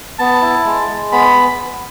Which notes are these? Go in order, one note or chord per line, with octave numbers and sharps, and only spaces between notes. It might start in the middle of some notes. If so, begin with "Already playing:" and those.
B3 A5
E4
G#3
G#3
B3 B5